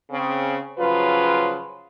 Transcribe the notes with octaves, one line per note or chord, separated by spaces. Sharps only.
C#3 C4
C#3 F3 F#3 F4 B4